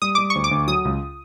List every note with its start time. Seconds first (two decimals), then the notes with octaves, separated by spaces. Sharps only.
0.02 G3 D#6
0.15 G3 D6
0.30 C#6
0.35 D2
0.44 D6
0.51 D2
0.67 F#3 D#6
0.85 C#2